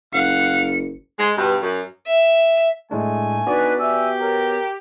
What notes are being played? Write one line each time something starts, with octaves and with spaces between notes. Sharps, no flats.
F#1 F5 F#5 C#7
G#3
G2 B2
F#2
E5
A2 G#3 A3 D4 G#5
B3 D4 D#4 F#4 B4 D5
G4 E5 G#5 E6
A#4 C#5